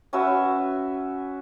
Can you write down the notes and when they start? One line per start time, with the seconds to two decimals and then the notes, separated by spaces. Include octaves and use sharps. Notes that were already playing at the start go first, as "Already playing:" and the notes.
0.13 C#4 F#4 B4 E5